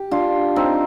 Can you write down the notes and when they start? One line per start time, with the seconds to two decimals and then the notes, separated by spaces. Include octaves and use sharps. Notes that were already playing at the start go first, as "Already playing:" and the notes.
Already playing: G4
0.11 D4 F4
0.56 C4 D#4